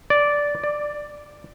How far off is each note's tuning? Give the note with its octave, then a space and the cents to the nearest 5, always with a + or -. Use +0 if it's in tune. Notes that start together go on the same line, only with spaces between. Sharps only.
D5 -10
D5 +10